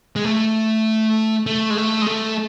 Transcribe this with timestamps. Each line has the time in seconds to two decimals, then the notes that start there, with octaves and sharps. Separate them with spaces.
0.16 G#3
0.25 A3
1.46 A3
1.70 G#3
1.77 A3
2.02 G#3
2.07 A3